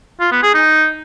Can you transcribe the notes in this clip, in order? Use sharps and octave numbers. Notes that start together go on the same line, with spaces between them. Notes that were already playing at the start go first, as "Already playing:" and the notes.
F4
B3
G#4
D#4